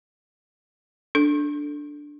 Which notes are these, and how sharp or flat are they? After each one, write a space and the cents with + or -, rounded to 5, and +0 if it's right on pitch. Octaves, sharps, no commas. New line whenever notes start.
D4 +0 A4 +0